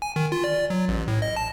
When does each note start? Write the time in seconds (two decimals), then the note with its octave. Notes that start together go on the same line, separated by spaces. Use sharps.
0.02 G#5
0.16 D#3
0.32 F4
0.44 D5
0.70 F#3
0.89 A1
1.08 A2
1.22 D#5
1.36 A5